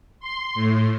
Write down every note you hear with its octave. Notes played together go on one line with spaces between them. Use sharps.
C6
A2